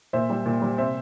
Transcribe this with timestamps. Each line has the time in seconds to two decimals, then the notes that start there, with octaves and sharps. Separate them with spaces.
0.13 A#2 C5 E5
0.30 G3
0.46 A#2
0.62 G3
0.78 C3 C5 E5